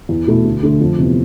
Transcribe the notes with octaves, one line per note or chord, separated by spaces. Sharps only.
E2
B2 A3 E4
D2
D3 A3
F2
C3 E3 B3